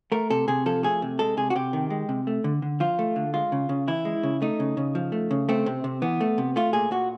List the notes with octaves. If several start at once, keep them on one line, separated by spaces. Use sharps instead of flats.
A3 A#4
C3 A4
C3 G#4
F3 A4
A3 G#4
C3
G#3 A4
C3 G#4
F#4
C3 G4
D#3
G#3
C3
A3
D3
D3
F3 F4
A3
D3
G#3 F4
C#3
C#3
E3 E4
G#3
C#3
A3 D#4
C#3
C#3
F3
A3
C#3
A3 C4
C3
C3
E3 B3
A3
C3
A3 F4
A#2 G#4
A#2 F#4